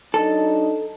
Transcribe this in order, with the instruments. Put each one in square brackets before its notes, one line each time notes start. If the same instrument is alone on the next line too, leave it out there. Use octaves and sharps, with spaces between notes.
[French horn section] F#3 D4 D#4 [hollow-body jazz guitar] A4